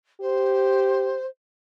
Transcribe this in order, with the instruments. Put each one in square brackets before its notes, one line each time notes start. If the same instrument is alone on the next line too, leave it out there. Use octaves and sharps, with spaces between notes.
[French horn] G4 [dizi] C5